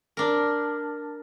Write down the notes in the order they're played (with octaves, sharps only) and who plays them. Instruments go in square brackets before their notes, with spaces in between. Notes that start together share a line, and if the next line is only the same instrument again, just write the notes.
[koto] D4 A#4